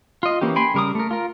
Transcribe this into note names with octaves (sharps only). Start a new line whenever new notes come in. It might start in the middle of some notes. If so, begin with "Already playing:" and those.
F4 D#5
E3 A#3 C#4 G4
G5 G#5 B5 C6
C#3 G3 A#4 D6 D#6
A3 A#4
F4 A#4